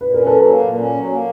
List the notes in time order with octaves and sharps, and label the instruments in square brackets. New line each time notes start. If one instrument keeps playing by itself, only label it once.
[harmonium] A#2 [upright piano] B4
[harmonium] C#4 [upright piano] A#4
[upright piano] A4 B4
[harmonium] F#3
A#3
A#2
C#4
F#3
A#3